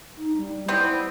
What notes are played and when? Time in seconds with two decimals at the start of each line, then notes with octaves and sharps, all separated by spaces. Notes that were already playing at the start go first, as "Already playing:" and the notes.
0.18 D#4
0.37 G3
0.68 G3 B3 C4 E4